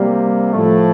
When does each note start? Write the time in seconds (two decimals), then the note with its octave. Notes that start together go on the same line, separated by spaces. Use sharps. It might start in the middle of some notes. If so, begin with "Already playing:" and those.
Already playing: C3 G3 A#3
0.52 A2 F3 A3